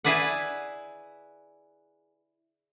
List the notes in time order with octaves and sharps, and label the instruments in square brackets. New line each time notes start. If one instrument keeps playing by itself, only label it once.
[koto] E4 G#4 B4 D5 F#5